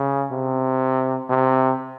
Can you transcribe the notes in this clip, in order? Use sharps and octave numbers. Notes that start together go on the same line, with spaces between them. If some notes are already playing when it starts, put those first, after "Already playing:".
Already playing: C#3
C3
C3